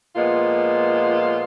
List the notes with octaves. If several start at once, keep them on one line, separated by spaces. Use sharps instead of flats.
A#2 F3 G#3 B3 F4